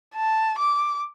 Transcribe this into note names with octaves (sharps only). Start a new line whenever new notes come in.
A5
D6